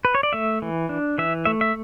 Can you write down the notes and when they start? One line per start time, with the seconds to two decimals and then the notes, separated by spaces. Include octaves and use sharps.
0.05 B4
0.15 C#5
0.23 D5
0.33 A3 E5
0.62 E3
0.89 D4
1.18 E3 E5
1.45 A3 E5
1.61 E5